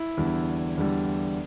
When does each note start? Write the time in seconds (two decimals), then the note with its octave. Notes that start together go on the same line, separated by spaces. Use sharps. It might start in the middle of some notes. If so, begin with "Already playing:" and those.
Already playing: E4
0.17 E2 D3 G3
0.77 E2 D3 G3